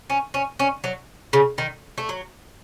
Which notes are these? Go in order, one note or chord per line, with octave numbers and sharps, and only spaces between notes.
C#4
C#4
C#4
F#3
C#3
D#3
A3
F#3